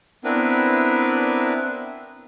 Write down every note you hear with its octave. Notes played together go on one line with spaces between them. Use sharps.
B3 C4 D4 E4 A#4 B4